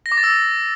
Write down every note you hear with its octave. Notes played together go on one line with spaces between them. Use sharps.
A#6
D6
A6
E6